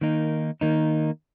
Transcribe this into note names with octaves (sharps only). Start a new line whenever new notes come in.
D#3 A#3 D#4
D#3 A#3 D#4